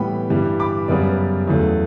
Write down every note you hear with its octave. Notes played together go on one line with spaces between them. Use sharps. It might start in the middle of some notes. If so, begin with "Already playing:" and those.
Already playing: A2 E3 G3 B3 G5 B5
G2 E3 G3
B5 D6
F#2 C#3 G3 B3 B4 D5
E2 C#3 F#3 A3